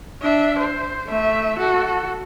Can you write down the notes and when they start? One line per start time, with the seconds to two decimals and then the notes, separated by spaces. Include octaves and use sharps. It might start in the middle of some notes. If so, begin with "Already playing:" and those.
0.22 D4 E5
0.59 C5
1.07 A3 E5
1.58 F#4 A4